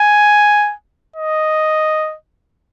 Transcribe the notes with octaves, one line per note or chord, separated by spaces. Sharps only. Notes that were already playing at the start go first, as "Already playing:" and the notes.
Already playing: G#5
D#5